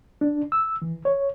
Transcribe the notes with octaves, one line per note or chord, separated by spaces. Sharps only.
D4
E6
E3
C#5